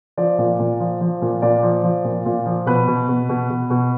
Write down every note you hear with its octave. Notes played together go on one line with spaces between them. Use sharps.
F3 D5
A#2
A#2
F3
F3
A#2
A#2 D5
F3
F3
A#2
A#2
F3
B2 B4
B2
B2
B2
B2
B2